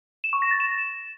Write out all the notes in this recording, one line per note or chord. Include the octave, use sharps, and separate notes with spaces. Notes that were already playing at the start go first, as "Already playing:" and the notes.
E7
C#6
A#6
A6
E7